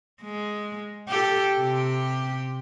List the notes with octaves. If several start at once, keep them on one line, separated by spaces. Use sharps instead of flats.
G#3
G4 A4
C3 G4